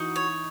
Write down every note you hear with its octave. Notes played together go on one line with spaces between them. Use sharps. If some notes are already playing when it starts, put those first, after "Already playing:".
Already playing: E3 D#4 F#4
C#5